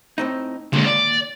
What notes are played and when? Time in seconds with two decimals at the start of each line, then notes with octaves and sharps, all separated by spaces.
0.18 A2 C4 D#4
0.73 D#2 A#2 D3 G#3
0.86 D5